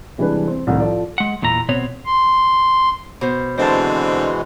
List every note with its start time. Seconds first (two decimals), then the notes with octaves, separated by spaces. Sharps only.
0.18 C3 E3 G3 G#3 D4 B4
0.47 C4
0.67 C2 A2 D#3
0.79 F3 F4 A4 D5
1.18 G#3 F#5
1.42 E2 A#2 E3 A#5
1.69 B2 B3 C4 C#5
2.05 C6
3.21 B2 C5
3.58 B2 D3 E3 G#3 C4 C5 A5